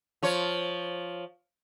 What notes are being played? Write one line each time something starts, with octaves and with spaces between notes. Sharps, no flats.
F3 C#5